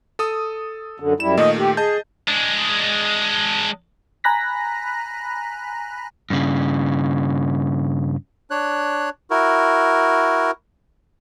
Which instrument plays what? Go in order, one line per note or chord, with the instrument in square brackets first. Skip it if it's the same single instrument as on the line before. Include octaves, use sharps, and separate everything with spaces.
[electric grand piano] A4 D#6
[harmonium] F#2 D3
[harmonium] F#2 G3 E4 [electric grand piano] E7
[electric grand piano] A#2 D#3 A3 [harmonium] D#5
[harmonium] G4
[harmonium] G#4 [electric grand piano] D#5 A5 G6
[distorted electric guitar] G#3 D4
[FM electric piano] G#5 A#5 B5 F#6 A#6 B6
[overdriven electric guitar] G2 C#3
[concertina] D4 C#5 F#6
E4 F#4 A#4